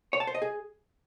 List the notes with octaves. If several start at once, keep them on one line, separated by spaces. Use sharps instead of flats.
C#5
A5
C5
D#5
G#4